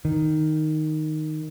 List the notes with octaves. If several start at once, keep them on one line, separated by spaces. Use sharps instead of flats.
D#3